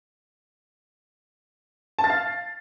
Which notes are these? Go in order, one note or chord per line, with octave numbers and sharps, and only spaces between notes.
A5
A6
F5